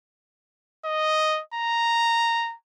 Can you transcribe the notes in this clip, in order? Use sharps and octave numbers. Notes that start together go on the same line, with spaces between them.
D#5
A#5